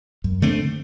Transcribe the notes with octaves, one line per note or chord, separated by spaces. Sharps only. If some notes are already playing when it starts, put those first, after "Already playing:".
F#2
D3 A3 C4